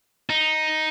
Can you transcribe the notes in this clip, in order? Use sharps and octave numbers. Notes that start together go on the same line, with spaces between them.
D#4